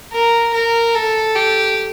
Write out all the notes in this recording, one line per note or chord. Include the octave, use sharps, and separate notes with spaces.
A#4
A#4
A4
G4